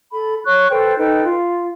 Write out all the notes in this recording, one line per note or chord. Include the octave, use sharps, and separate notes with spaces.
A4 B5
C#5 C#6 F#6
A4 B4 C5 G5
D#4 A4 B4 G5
F4